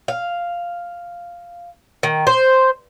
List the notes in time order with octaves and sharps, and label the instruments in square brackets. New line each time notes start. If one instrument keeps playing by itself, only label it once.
[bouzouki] F5
D#3
C5